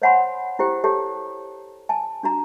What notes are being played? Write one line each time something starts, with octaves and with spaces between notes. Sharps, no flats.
C5 C#5 F#5 G#5 B5 C6
E4 G4 C5 G5
G4 A4 C#5 G5 A5
G#5 A5
D4 F#4 A#5